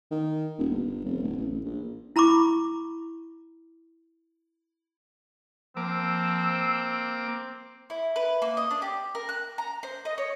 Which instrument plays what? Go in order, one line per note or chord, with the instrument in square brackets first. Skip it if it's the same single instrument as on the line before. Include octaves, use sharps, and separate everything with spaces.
[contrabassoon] D#3
D#1
G1
F1
D1
A1
A1
A#1
[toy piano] E4 A#5 B5 C#6 D6
[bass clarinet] F3 [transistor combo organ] A#3 D6 [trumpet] C4 [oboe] E6
[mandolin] E4
B4
A#3
D#5
D4
G4
A#4
F#6
A#5
C5
D#5
C#5